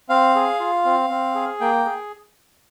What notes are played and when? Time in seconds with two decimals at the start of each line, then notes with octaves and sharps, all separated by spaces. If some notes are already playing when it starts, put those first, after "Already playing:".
0.09 C4 F5
0.35 G#4
0.60 F4
0.85 C4
1.10 C4
1.35 G#4
1.60 A#3 G5
1.86 G#4